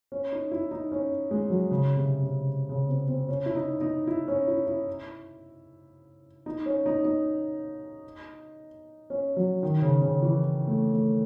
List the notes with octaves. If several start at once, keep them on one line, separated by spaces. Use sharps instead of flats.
C#4
D#4
E4
D#4
C#4
G#3
F#3
C#3
C3
C#3
C#3
C4
C4
C#4
E4
D#4
D#4
E4
C#4
E4
E4
D#4
C#4
D#4
D#4
C#4
F#3
D#3
C#3
C#3
E3
A3
A3